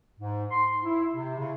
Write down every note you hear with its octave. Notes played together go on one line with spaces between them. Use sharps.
G#2
C6
E4
C3
C#3